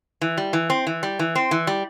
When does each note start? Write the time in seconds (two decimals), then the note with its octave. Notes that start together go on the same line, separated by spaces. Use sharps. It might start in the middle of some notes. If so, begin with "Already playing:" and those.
0.21 E3
0.38 G3
0.53 E3
0.70 C4
0.87 E3
1.03 G3
1.19 E3
1.35 C4
1.51 E3
1.67 G3